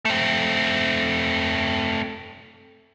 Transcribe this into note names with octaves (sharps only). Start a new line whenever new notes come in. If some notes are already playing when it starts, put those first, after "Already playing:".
A3 C4